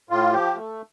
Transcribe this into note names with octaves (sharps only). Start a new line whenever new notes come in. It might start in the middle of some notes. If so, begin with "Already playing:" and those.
A2 F4
F3 G4
A3